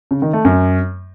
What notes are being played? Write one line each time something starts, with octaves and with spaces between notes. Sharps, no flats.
C#3
D#3
A3
F#2